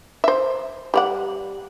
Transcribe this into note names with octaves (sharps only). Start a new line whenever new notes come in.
C5 E5
G3 D5 F#5